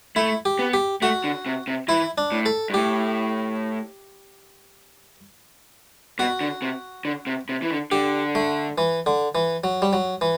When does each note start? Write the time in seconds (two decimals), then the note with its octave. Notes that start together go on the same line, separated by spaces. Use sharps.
0.16 A3 E4
0.45 G4
0.59 B3
0.74 G4
1.02 A3 F#4
1.24 D3
1.46 C3
1.67 C3
1.88 E3 E4
2.18 D4
2.32 A2
2.46 A4
2.70 G2
2.74 A2 G4
6.19 B2 F#4
6.41 D3
6.62 C3
7.05 D3
7.27 C3
7.49 C3
7.62 E3
7.71 D3
7.92 D3 G4
8.35 A3
8.78 E3
9.06 D3
9.35 E3
9.64 F#3
9.82 G3
9.93 F#3
10.21 E3